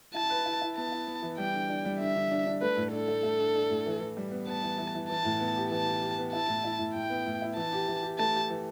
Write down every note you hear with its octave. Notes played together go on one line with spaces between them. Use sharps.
E4 A5
B4
E4
E4
B3 A5
E4
B3
E3
G3 G5
D3
D4
G3
D3 E5
D3
D4
D4
A3 B4
A2
D4 A4
A3
A3
D4
D4
A2
E3
E3
G3
B3
B3 A5
E3
E3
E3
E3 A5
A2
B3
G4
E3 A5
G4
G4
B3
E4 A5
A2
E4
A2
A2 G5
B3
A2
E4
E3 A5
G4
E3
G4
A3 A5
G4
E3